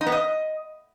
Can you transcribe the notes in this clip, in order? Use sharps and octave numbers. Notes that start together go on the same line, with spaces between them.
D#4
B3
D#5